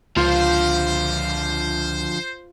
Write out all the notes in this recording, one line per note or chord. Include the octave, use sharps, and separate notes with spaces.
C#2 D3 F3 F4 C5